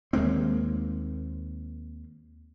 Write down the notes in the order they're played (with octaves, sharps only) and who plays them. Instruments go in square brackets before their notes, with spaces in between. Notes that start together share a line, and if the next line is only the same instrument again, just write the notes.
[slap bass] D#2 G#3 A#3 C4